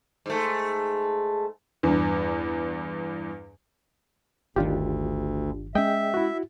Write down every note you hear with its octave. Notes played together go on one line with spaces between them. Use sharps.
G#2 A3
E2 G2
G1 D2 D#3 D4 F4 G4
G#3 C#4 G#4 D#5 E5 G5
E4 F#4